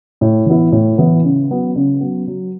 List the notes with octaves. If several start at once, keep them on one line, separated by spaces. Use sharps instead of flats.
A2
E3 B3 E4
A2
E3 B3 E4
C#3
F#3 B3
C#3
F#3 B3
F#3